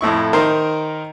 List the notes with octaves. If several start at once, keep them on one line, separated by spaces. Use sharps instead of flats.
F2 A2 E4 C#6
D#3 A#4 C5